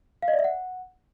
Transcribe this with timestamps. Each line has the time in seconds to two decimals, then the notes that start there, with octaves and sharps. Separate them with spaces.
0.22 F5
0.28 D#5
0.33 D5
0.39 E5
0.44 F#5